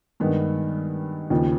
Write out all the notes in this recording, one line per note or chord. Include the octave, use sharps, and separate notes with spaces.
G2 D#3 G#3 B3
D#2 C#3 F3